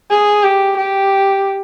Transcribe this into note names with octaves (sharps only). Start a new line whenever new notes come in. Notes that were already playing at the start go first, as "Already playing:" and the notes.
G#4
G4
G4